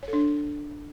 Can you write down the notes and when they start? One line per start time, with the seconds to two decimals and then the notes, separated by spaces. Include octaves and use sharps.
0.03 C#5
0.08 A4
0.13 D4